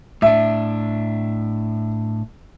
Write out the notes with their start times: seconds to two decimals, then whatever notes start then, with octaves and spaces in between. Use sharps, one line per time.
0.22 A2 D4 E5